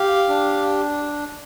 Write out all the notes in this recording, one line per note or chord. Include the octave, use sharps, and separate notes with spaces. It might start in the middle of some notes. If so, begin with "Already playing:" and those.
Already playing: G4 F5
D4